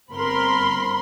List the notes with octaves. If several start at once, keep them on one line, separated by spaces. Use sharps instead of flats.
G1 C4 A#4 B5 C6